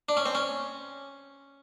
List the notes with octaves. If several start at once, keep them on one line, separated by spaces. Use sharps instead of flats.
D4
C#4
C4
C#4